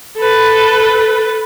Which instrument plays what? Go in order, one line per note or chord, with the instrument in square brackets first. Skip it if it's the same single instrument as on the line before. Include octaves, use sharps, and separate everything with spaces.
[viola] A4 B4